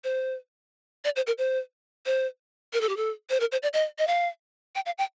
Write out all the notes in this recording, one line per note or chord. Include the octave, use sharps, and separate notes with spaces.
C5
D5
C5
A#4
C5
C5
A#4
A4
G4
A4
C5
A#4
C5
D5
D#5
D#5
F5
G5
F5
G5